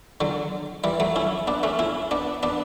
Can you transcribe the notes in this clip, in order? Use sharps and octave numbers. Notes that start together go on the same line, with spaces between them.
D3 F#3
E3 G3
F#3 A3
C#4 E4
B3 D4
A3 C#4
C#4 E4
B3 D4
B3 D4